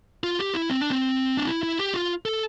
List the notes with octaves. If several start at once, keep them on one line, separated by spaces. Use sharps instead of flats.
F4
G4
E4
C4
D4
C4
D4
E4
E4
G4
F4
A4